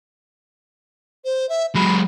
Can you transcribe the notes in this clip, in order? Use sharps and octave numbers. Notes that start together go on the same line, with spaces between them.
C5
E5
F#3 G#3 B5